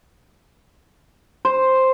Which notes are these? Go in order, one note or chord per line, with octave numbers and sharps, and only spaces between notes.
C5